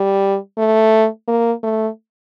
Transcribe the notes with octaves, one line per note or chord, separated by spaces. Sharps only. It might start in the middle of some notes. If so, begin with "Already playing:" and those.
Already playing: G3
A3
A#3
A3